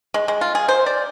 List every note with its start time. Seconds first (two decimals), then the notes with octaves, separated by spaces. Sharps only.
0.14 G#3
0.28 G#3
0.41 F4
0.55 G#4
0.68 C5
0.86 D5